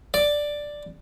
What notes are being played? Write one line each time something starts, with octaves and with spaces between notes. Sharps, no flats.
D5